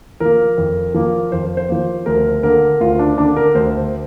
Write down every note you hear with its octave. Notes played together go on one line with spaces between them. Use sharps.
F3 A#3 A#4
F2
F3 A#3
F2 C5
C5
F3 A#3
D2 A#4
D3 A#3 A#4
D2 F4
D4
D3 A#3 D4
A#4
D2 C5